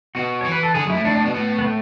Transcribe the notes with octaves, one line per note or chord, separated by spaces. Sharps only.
B2 F#4
E3 C#5
B4
A4
D3 G#4
F#2
E4
A2
A2 D4
D4
B2 B3
A2
B3
A3